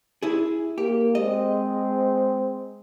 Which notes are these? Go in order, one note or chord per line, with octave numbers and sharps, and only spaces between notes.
E4 G#4
A#3 G4
G#3 C4 D#5